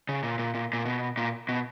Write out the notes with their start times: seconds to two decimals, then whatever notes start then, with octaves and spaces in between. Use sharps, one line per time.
0.09 C#3
0.23 A#2
0.39 A#2
0.54 A#2
0.73 A#2
0.85 B2
1.17 A#2
1.49 B2